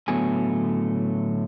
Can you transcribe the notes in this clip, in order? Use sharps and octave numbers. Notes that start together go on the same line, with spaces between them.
A2 D3 F#3 A3 B3 G#5